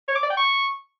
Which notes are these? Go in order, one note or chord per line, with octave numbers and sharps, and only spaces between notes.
C#5
D6
D5
G5
C#6